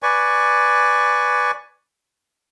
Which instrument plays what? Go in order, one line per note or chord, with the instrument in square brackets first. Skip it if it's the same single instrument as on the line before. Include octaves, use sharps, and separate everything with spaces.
[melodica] B4 D5 G#5 C#6